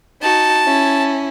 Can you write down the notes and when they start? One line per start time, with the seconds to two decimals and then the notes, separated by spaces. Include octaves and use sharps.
0.22 D#4 F#4 A5
0.66 C#4 E4